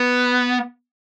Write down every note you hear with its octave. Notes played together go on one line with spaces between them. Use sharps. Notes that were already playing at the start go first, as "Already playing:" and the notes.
Already playing: B3